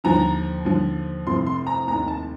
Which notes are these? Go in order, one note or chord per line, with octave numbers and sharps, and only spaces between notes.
D#2 D3 F3 A#5
D#2 D3 F3
F1 F2 C3 F3 C6
C6
A#5
F1 D#2 D#3 A#5
A5